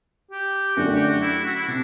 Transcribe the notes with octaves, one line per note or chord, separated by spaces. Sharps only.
G4
F#2 D3 A3 D4 F#4
G4
F#4
E4
F#4
E4
C3 D4